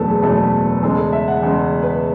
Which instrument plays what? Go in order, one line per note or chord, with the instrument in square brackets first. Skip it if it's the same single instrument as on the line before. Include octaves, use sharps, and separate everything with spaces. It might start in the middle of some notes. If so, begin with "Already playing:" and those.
Already playing: [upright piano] F#1 E2 B2 A3 A4 B4
G#4
F#1 E2 B2 A3 A4
E2 C#3 G#3 A4
A4
E5
F#5
E2 C#3 G#3
B4